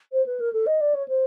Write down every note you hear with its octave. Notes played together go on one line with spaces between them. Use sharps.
C5
B4
A#4
A4
D#5
D5
C#5
C5